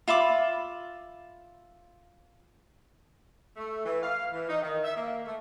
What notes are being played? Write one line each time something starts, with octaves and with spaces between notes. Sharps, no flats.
F4 E5 B5 D6
A3
E3
F5
E3
D#4
D#3
E5
A#3
A3